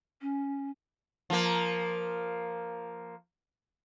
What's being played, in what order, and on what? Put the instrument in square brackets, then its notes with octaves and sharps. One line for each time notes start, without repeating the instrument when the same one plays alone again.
[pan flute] C#4
[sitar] F3 A#3